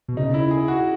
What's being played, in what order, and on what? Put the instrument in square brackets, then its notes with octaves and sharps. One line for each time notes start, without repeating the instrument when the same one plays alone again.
[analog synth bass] B2
[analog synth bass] C#3 [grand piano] D#4
[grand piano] E4
G#4
F#4